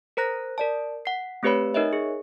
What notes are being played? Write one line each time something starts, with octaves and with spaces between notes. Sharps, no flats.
A#4 C5 A#5 F#6 A#6
A#4 D5 A5
F#5 C7
A3 C4 G4 B4 C#5 B5
D#4 A#4 C#5 D#5 E5
G#4